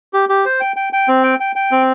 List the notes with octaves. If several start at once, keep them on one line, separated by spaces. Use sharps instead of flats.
G4
G4
C5
G5
G5
G5
C4
G5
G5
G5
C4